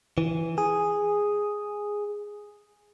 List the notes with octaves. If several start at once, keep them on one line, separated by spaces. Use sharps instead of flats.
E3
G#4